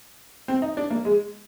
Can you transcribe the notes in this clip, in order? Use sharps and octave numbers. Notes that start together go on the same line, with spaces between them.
C4
D#4
D4
A#3
G#3